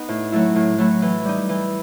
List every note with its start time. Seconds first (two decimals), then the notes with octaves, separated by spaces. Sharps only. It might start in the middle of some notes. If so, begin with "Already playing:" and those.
Already playing: B3 D#4
0.08 A2
0.32 F#3 A3 E4
0.55 A2
0.78 F#3 A3 E4
1.02 E3
1.25 G3 D#4
1.49 E3